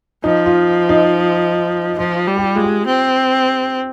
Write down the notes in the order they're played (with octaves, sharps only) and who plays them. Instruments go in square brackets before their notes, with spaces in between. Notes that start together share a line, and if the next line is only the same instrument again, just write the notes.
[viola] F3 [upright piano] D#4
[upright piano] F4
D#4
[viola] F3 [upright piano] F4
[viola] G3
[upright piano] G4
F4
[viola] G#3 [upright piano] F4
[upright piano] G4
[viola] C4